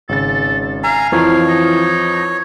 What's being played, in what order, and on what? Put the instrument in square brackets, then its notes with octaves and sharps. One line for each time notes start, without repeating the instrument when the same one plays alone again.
[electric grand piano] G#1 C#3 A6 [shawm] A4
[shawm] F5 [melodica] G#5 A#5
[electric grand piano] F2 F3 [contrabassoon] E3 [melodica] C#5 [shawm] F5
[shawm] D#4